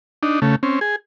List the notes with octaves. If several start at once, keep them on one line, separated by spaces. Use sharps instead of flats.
D4 D#4
C#3 A3
C4 C#4
G#4